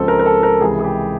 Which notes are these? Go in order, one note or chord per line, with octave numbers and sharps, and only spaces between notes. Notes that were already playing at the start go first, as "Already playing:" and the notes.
Already playing: C#2 C#3 F3 G#3 C4 A4
A#4
A#4
A4
A#4
C#2 C3 E3 G#4
G#4
G4